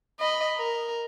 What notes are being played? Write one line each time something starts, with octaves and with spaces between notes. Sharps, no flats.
D#5 B5
A#4